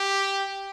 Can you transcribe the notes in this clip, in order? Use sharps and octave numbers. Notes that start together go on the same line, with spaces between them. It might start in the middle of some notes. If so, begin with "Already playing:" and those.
Already playing: G4